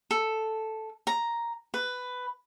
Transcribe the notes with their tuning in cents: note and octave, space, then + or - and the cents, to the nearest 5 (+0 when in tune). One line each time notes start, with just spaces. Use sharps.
A4 +0
A#5 +5
B4 +10